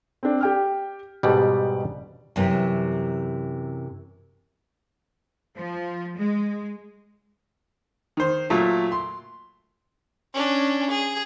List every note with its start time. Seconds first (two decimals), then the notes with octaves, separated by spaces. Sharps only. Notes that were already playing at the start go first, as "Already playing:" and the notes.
0.23 C4 D4
0.41 G4 G5 F6
1.23 G#2 B2 G3 G4 D5
2.36 F#2 C3 E3
5.55 F3
6.18 G#3
8.17 D#3 C5
8.50 A#2 F#3 A3
8.92 C6
10.34 C#4 D4
10.90 G#4